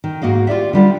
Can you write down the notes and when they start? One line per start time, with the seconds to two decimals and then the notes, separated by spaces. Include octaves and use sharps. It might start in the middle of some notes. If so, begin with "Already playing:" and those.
0.04 D#3
0.22 G#2 A#3 F#4 D#5 F5
0.47 F4 G4 D5 E5
0.73 D3 G3 F4